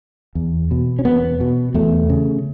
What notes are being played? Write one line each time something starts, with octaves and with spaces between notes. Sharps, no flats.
E2
B2
C#4
E2 B3
B2
E2 A3
C#3